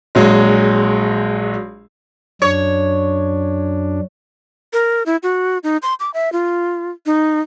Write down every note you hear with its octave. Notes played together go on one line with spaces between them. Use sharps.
A#1 F#3 G#3
F#2 D4 C#5
A#4
E4
F#4
D#4
C6
D6
E5
F4
D#4